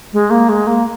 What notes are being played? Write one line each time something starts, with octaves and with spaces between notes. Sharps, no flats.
G#3
A#3
G#3
A#3